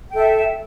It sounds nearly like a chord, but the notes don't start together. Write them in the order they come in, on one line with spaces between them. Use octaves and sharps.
G5 A4 E5